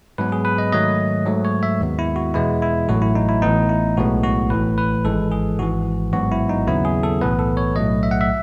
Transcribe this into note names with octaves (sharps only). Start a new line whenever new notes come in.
G#2 F#3 B3 B4
G#4
B4
D#5
G#2 D#3 F#3 A3 D#5
G#2 F#3 A3
C#5
E5
D#2 D#3 G#3 B3
E4
F#4
E2 B2 G#3 B3 E4
E4
A1 A2 F#3 A3 F#4
E4
D#4
E4
A1 A2 E3 B3 D#4
E4
B1 A2 G#3 B3 F#4
F#4
A1 A2 E3 B4
B4
G#1 G#2 E3 G#3 A4
G#4
G#1 G#2 E3 F#4
A1 G#2 F#3 B3 F#4
E4
D#4
D#2 C#3 F#3 B3 E4
G#4
A4
B1 A2 E3 B3 B4
A4
C#5
B1 A2 F#3 A3 D#5
E5
F#5
E5